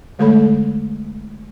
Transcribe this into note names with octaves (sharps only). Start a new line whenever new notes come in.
D3 G#3 A3 A4 C#5 B5